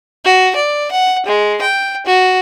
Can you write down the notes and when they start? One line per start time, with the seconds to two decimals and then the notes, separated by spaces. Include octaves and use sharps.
0.24 F#4
0.55 D5
0.91 F#5
1.26 G#3
1.61 G5
2.06 F#4